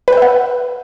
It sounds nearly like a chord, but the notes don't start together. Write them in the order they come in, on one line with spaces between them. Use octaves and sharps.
B4 G5 E5 F#5